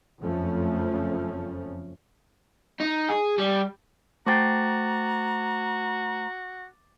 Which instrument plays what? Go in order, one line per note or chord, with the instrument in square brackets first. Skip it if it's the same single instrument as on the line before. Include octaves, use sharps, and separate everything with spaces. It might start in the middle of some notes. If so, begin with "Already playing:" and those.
[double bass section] F#1 F2 F3 A3 C#4
[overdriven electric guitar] D#4
G#4
G3
[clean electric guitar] A3 C5 G5 [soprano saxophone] F#4 [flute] A#5 [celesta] D6 A6